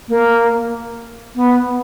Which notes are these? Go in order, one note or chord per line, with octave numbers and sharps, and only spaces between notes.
A#3
B3